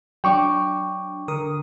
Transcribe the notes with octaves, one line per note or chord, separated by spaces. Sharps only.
F#3 D4 G5 C#6 D6
D3 A#4 D#6